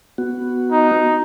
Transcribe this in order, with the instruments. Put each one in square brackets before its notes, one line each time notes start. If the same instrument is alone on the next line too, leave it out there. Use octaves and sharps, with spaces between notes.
[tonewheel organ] B3 F#4
[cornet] D#4